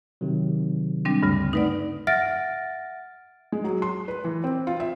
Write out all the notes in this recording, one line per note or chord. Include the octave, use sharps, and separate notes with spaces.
C3 D#3 F#3
G3 C4 D4
D2 G2 C#3 G3
A3 D#4 B4 D5 F#5
E5 F#5 F6 A6 A#6 D7
G#3
F#3
C6
B4
E3
C4
F4
E5